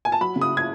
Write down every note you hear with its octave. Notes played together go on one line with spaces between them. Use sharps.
G#5
A5
F#3 B5
C#3
D#6
G#6